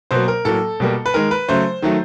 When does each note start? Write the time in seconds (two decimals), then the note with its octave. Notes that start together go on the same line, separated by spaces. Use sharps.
0.11 B2 F#3 A#3 C5
0.28 A#4
0.45 A2 F#3 A#3 A4
0.80 B2 G3 A#3
1.06 B4
1.14 D#3 G#3 A#4
1.31 B4
1.49 C#3 F#3 A3 C5
1.82 D#3 F#3 A3